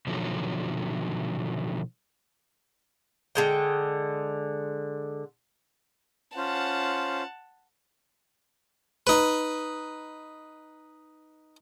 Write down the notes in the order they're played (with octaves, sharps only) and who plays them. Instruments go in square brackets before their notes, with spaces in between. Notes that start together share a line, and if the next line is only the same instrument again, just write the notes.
[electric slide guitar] B2 D3 D#3 F3 F#3
[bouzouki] D3 G#3 G5
[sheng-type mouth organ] C#4 F4 C5 [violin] F#5 A5
[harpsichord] D#4 B4